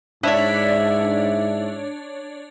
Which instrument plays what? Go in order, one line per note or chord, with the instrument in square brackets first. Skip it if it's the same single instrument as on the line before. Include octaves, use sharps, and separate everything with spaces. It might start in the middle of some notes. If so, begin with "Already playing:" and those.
[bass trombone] G#2 [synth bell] D4 C#5 D5 [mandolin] E4 E5